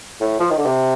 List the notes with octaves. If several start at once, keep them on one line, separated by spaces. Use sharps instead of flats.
A2
F3
D#3
D3
C3